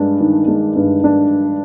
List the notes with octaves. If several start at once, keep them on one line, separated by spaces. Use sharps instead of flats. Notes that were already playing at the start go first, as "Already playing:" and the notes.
Already playing: G2 G#3 D4
D#3
G#3
G2
D4